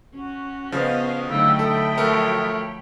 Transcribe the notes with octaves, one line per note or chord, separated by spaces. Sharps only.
C#4 F#4
C#3 F3 B3 D#5 F5
D3 F#3 A3 D#4 F5 G5 B5 E6
A4 E5 A5 D#6
F3 A3 A#4 C#5